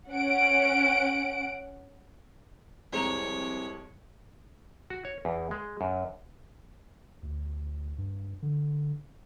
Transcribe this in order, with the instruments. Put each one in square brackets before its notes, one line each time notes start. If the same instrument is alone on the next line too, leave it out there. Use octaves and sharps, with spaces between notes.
[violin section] C#4 F#5 D7
[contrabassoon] C2 [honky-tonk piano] F2 G#3 F7 [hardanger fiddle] C#5 [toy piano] D5 A#5
[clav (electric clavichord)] F#4
C#5
E2
G#3
F#2
[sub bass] D2
G2
D3